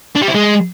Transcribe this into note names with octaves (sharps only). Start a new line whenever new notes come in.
D4
G3
E4
G#3